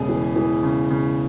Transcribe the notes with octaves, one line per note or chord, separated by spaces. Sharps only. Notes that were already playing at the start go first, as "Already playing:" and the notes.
Already playing: E1 C#3 G#4
E3
E3
C#3
C#3